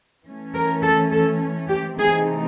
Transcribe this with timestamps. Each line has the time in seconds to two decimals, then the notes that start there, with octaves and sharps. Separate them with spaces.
0.25 E3 A3 C#4
0.54 A#4
0.82 A4
1.11 A4
1.69 G4
1.98 C3 E3 A3 C4 D#4 G#4